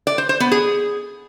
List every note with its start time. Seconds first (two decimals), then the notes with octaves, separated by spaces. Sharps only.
0.07 D5
0.18 C5
0.29 C5
0.40 B3
0.52 G#4